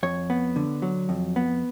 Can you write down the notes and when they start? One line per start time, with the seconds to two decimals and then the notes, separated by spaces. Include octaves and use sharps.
0.03 F2 C#5
0.30 B3
0.56 D3
0.82 F#3
1.09 F2
1.36 B3